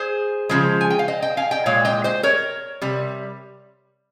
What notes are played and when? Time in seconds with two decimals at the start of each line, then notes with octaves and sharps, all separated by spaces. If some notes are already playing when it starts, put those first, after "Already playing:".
Already playing: G#4 C5
0.49 C#3 F3 G#3
0.81 G#5
0.90 G5
0.99 F5
1.08 C5 D#5
1.22 D#5 G5
1.37 F5 G#5
1.51 D#5 G5
1.66 A#2 G#3 C#5 F5
1.85 D#5 G5
2.04 C5 D#5
2.23 A#4 C#5
2.81 C3 G3